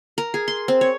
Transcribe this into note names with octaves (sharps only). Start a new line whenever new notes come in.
A#4
G#4
C6
C4
C#5